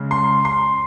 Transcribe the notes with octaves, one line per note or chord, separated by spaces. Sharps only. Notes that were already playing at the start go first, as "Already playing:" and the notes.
Already playing: C#3 G#3 C#4
C6
C6